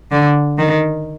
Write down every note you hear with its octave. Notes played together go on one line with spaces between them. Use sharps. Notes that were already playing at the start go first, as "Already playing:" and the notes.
D3
D#3